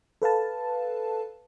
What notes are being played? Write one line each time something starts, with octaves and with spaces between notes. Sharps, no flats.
A4 B4 F5 A5